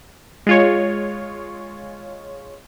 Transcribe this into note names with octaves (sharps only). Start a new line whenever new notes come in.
G#3 F4 C#5